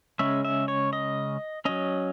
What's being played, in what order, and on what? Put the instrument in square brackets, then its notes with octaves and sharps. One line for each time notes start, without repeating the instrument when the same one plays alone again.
[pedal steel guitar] C#3 G#3 C#4 E5
E5
C#5
D#5
F#3 C#4 D#5